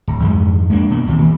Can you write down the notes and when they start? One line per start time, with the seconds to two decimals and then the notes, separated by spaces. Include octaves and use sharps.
0.08 D1
0.22 F2 G#2 G#3
0.70 G#3 A#3 C4 D4
0.90 B2 A#3
1.07 E1 D#2 A#2 C4
1.22 D#2